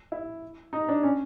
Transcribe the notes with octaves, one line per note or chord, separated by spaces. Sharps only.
E4
D#4
D4
C#4